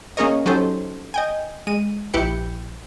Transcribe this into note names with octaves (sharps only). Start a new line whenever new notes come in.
A#3 C#4 G#4 A#4 C#5 D#5
F#3 C#4 D#4 G4 A4 C5
D#5 G5 G#5
G#3 D#7
A#1 E4 G4 B4 G5 C#7